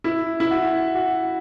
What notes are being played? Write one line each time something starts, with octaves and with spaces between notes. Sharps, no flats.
E4
E4
F#4
F#4